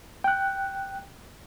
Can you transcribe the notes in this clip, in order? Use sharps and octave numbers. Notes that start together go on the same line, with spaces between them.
G5 F#6